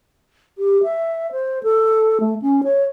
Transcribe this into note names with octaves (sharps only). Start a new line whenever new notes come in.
G4
E5
C5
A4
A3
C#4
C#5